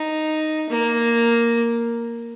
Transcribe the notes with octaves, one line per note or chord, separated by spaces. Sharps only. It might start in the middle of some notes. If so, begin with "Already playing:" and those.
Already playing: D#4
A#3